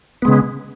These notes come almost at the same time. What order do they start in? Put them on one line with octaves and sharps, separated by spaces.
B3 G#3 C#3